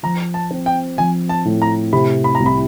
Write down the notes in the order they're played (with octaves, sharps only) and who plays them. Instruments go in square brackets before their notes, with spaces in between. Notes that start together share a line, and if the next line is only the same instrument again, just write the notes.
[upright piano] F3 [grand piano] A#5
[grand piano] A5
[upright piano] C4
[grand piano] G5
[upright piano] F3 [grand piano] G#5
[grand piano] A5
[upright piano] A2
[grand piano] A#5
[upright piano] C3 [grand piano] B5
[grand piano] B5
A#5
[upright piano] C2
[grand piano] B5